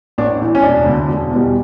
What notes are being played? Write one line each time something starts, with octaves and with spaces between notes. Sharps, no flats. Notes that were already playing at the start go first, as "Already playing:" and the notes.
A1 D4
A2 E3
C#4
E1 D4
D2 D3
E1
E2 B2 G3